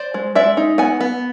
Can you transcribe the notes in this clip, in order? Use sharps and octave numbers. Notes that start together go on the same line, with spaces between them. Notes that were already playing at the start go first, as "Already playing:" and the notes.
Already playing: C5 D5
G#3
G#3 D5 E5
D#4
B3 F#5 G#5
B3